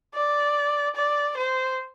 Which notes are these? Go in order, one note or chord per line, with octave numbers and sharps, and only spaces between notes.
D5
D5
C5